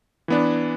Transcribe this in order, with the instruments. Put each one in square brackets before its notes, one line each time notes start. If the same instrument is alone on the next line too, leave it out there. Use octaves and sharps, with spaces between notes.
[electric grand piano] E3 B3 D4